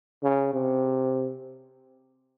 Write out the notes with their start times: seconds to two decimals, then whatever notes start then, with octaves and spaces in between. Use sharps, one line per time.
0.23 C#3
0.53 C3